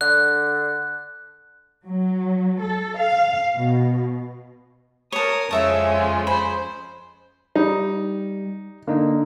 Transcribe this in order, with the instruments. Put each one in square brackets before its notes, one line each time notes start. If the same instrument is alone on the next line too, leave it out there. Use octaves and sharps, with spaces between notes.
[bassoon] D3 [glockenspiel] F#6
[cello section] F#3
A4
F5
B2
[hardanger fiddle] A#4 D#6 [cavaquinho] C#5 A5
[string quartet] F2 C#3 G#3 [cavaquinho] E4 E5 A5 [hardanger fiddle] C#5
[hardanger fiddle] F4
[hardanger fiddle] C5 [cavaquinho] B5
[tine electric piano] G3 [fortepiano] D#4
[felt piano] D3 [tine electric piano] A#3 D#4 D#5